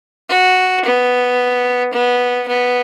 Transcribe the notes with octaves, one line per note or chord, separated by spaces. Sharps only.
F#4
B3
B3
B3